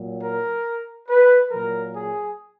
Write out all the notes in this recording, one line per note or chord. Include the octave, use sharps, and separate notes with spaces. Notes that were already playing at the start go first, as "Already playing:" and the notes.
Already playing: A#2 F#3
A#4
B4
A#2 F#3 A#4
G#4